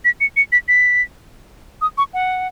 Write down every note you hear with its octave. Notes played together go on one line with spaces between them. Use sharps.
B6
C#7
C#7
B6
B6
D#6
C#6
F#5